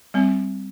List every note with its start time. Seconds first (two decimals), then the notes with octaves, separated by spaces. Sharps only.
0.14 G3 C4